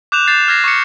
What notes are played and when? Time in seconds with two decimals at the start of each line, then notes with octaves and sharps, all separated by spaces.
0.12 D6 F#6 G6 E7 F7
0.27 G6 A6 C7 E7 F7
0.48 F6 F#6 G#6 A#6 C7
0.64 C#6 D6 C#7